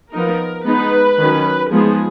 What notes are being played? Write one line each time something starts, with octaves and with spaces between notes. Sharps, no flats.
F3 B3 D#4 A#4
G#3 B3 D#4 B4
D#3 F#3 C#4
F3 G#3 B3 D#4 G#4